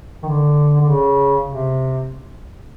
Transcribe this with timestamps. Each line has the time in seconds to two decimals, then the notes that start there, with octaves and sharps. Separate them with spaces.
0.23 D#3
0.29 D3
0.81 D3
0.89 C#3
1.48 C3